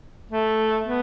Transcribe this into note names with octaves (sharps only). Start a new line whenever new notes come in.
A3
B3